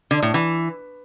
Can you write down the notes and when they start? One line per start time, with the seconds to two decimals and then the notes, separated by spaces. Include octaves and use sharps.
0.11 D3
0.22 A2
0.34 E3